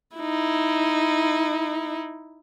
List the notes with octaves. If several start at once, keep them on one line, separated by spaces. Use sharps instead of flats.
D#4 E4